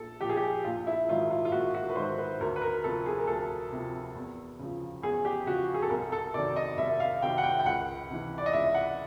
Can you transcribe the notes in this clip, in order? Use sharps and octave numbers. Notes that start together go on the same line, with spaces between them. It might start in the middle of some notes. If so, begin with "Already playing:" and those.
Already playing: A#1 A4
A#2 F3 G4
G#4
G4
A#1 F4
E4
G#2 D#3 F#3 F4
F4
F4
A#1 F#4
F#4
B4
G#2 D#3 F#3 C5
B4
D2 A#4
B4
A#4
C3 F3 A4
G#4
A#4
D2 A4
C3 F3
E2
C#3 F3
E2 G#4
G4
C#3 F3 F#4
G#4
A4
C2 A#4
A4
C3 D#3 F#3 D5
D#5
C2 E5
F5
C3 D#3 F#3 G5
F#5
G5
G5
C#2 F#5
C3 E3
D5
D#5
C#2 E5
F#5